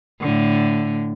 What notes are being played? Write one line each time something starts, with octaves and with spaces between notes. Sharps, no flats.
A2 D3